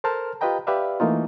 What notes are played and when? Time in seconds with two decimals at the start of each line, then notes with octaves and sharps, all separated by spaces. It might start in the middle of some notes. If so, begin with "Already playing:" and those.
0.04 A4 A#4 C5 A5 F6
0.41 F4 G4 B4 D#5 G5 A#5
0.67 G4 B4 D5 E5 F5
1.00 E3 A3 A#3 D#4 F4